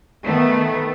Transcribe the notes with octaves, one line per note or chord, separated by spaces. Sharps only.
D#3 A3 B3